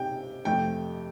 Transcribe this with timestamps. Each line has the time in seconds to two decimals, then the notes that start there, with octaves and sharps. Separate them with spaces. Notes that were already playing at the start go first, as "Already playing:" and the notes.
Already playing: C3 G5
0.45 F2 C3 A3 G5